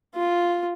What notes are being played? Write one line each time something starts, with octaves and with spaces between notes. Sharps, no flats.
F4